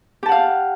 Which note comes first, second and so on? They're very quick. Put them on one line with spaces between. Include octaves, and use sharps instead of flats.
G4 A5 F#5 F5